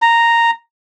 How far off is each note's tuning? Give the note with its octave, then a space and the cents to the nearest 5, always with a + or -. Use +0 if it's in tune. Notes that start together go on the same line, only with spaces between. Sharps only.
A#5 -5